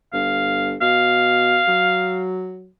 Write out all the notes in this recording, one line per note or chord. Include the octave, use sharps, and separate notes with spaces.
G1 F5
B2 F5
F#3